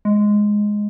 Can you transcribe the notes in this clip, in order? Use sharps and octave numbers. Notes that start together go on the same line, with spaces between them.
G#3